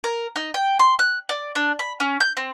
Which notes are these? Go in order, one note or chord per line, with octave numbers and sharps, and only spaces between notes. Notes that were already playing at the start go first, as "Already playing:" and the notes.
A#4
D#4
G5
C6
F#6
D5
D4
B5
C#4
G6
C4